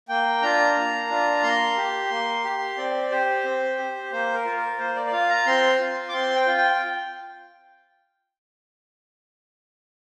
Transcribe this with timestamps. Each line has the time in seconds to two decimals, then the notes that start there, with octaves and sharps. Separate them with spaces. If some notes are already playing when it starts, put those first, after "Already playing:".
0.09 A#3 G5
0.42 D4 F4 A#5
0.76 A#3
1.09 D4 F4
1.43 A#3 C6
1.77 G4
2.10 A#3
2.44 G4
2.77 C4 D5
3.11 G4 C5
3.44 C4
3.78 G4
4.12 A#3 C5
4.34 A#4
4.45 F4
4.57 A#4
4.78 A#3 C5
4.96 D5
5.07 D5
5.12 F4 F5
5.29 A#5
5.46 C4 C6
5.80 F4
6.09 D6
6.13 C4 C6
6.36 G5
6.47 F4
6.58 G5